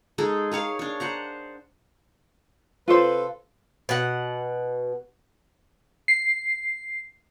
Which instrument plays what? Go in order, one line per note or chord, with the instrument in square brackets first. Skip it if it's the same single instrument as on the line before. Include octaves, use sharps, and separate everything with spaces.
[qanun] G#3 D#4 G#4 A4
G#4 A#4 C#5 F5
D4 C#5
C5 F#5 A#5
[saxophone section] C3 A4 B4 [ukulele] F4 C5
[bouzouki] B2 F#5
[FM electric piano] C7